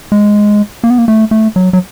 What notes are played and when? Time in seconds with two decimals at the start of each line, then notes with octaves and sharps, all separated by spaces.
0.12 G#3
0.84 A#3
0.90 B3
0.98 A#3
1.08 A3
1.31 A3
1.56 F#3
1.73 F#3